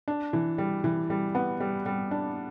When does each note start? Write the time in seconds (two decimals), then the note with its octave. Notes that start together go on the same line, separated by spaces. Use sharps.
0.08 D4
0.33 E3
0.58 G3
0.84 E3
1.10 G3
1.35 B3
1.60 G3
1.86 G3
2.11 D4